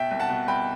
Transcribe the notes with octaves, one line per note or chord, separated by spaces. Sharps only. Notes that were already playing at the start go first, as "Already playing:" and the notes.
Already playing: B2 E5 G5
C2
F#5 A5
B2
C2 G5 B5